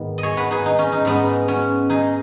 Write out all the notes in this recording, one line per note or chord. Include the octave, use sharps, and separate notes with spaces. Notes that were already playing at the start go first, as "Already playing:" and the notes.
Already playing: G#2 D#3 B3
D#5
G#4 C#5
F#4 B4
D#4 G#4
D#4
C#4
D#4
G#2 G#3 B3 D#4
C#4 F#4
D#4 G#4